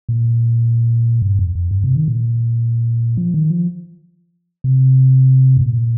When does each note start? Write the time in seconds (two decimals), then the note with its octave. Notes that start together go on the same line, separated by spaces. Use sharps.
0.09 A#2
1.22 G2
1.39 F2
1.55 F2
1.71 G2
1.84 C3
1.96 D#3
2.08 A#2
3.17 F3
3.34 D#3
3.50 F3
4.64 C3
5.57 G2
5.61 A#2